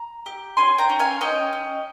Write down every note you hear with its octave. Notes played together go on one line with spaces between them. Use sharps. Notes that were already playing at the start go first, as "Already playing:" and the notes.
Already playing: A#5
G4
C#4 G#5 C6
G5 A#5
C#4
F5 G#5
C#4 D#5 G5
C#4